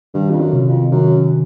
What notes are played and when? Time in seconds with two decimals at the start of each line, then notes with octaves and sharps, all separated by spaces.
0.14 G2 D#3
0.30 F2
0.40 F#2
0.53 C3
0.67 F2
0.92 F#2 D#3